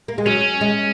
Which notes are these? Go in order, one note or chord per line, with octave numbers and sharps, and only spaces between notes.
A#3
G#3
F#3 C#4
G#3